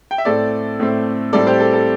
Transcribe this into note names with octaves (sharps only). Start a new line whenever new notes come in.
G5
E5
A2 A3 C4 A4 D5
A2 A3 C4
A2 G3 C4 A4 D5
G4 C5
A4
A4